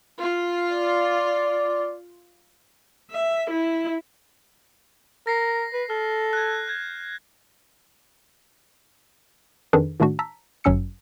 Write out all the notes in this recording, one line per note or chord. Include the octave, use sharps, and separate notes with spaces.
F4
D5
E5
E4
A#4 A#6 C7
B4
A4 F6
F#6 G#6
G6 G#6
F2 D#3 D4 G#4 A4 B4
A2 D#3 A3 D4 F#4
A5 A#5 E6 B6
G1 F#2 F#3 C#4 E6 C#7